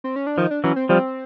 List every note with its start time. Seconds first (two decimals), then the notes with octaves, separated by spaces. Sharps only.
0.04 C4
0.16 C#4
0.27 D4
0.38 D#3 F3 D#4
0.51 D4
0.64 E3 F#3 C#4
0.76 C4
0.89 F3 G3 C4